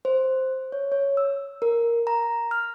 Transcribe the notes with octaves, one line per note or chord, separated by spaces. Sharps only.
C5
C#5
C#5
E6
A#4
A#5
F6